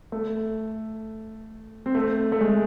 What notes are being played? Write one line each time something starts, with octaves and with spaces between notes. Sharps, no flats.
A3
C4
A3
A3
G#3